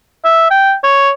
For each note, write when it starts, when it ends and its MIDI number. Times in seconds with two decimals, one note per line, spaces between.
0.25 0.48 76
0.51 0.74 79
0.84 1.10 73